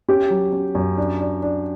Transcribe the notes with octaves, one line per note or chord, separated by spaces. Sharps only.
C#4 G4
F#3
C#4
F#2
D4
D4
D4